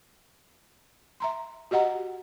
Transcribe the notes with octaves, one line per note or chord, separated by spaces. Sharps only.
E5 A#5 C6
F#4 G4 D#5 F#5 A#5